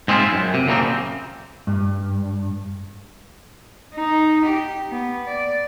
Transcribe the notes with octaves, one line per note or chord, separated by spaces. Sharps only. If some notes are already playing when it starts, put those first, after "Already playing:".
G#2 G#3 C4 C#4 E4 F4
F#2
C3
F#2 A#2 C#3 F3 A#3 C4
G2
D#4
G4
B3
D5